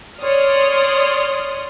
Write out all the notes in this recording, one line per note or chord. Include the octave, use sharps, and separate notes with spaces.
C#5 D5 C6 D#6 F6